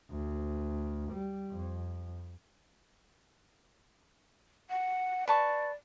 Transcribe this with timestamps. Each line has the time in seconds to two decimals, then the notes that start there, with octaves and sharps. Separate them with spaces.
0.11 D2
1.13 G3
1.51 F2
4.70 F#5
5.28 B4 D5 A5 C#6